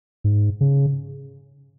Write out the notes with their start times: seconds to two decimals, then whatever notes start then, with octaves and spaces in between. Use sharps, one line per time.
0.24 G#2
0.61 C#3